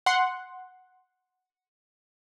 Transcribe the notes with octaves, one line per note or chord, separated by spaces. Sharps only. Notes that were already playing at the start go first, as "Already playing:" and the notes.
F#5 C6